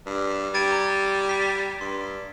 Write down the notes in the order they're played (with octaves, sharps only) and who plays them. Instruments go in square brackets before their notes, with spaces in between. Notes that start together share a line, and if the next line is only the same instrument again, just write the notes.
[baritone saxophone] G2
[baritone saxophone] G3 [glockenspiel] G#6 A6 D7
[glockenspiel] A#5
B6
[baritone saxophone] G2 [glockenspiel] C6